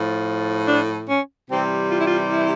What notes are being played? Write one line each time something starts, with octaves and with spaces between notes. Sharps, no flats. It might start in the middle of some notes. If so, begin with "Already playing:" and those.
Already playing: A2 F3
D4
C#4
C3 E3 G3 C4
F4
E4
F4
E4